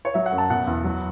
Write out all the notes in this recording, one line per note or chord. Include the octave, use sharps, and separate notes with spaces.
C#5
F#3 E5
F#5
F#2
A5
B2 F#5
E2
F#3